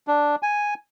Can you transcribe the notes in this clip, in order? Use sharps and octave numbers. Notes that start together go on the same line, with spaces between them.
D4
G#5